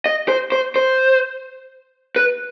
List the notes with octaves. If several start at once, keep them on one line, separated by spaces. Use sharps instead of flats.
D#5
C5
C5
C5
B4